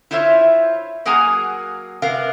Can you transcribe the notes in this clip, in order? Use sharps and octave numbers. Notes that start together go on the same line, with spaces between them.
E4 F4 C5 C#5 E5
F#3 A#3 G#4 F#5 G#5 A#5
C3 B3 A#4 F5